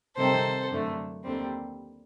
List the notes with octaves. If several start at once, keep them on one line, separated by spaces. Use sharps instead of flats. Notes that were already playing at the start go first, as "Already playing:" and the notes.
C3 D#3 G3 C4 A4 C5
F#2 D3 A3
D#2 D3 G3 C4